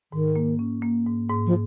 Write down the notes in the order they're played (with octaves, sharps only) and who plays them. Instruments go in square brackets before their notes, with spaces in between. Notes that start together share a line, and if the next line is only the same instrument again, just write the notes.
[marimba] G#2 [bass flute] D#3
[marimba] A#3
C#4
A#3
G#2
G#2
[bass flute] F3